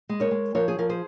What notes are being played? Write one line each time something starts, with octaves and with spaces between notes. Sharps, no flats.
G#3
A#4 C#5
G#3
F3 A#4 C#5
G#4
F3 A#4
G#4 C5